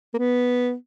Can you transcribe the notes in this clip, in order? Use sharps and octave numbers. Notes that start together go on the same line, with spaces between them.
A#3
B3